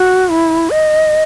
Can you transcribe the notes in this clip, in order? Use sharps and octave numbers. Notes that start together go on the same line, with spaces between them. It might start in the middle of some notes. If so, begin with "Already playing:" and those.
Already playing: F#4
E4
D#5